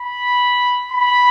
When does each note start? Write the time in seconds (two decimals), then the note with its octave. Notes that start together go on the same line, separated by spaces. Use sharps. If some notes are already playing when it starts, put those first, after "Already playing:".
Already playing: B5
0.92 B5